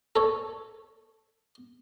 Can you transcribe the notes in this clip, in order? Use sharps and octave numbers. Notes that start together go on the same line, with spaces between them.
A4 C#5